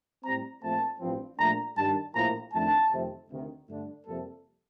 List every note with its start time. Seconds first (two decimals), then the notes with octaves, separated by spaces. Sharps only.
0.24 A2 G3 C4 A#5
0.62 A#1 A#2 A3 C4 A5
1.01 A1 G2 F3 C4
1.39 A#1 A#2 A3 D4 A#5
1.77 G2 D#3 G3 D4 A5
2.15 A#1 A2 F3 A#3 A#5
2.54 F2 D#3 A3 D4 A5
2.92 F2 C3 D#3 A3 C4
3.30 D2 C3 D#3
3.68 G2 D3 A3 D4
4.06 F2 C3 G3 A#3 A4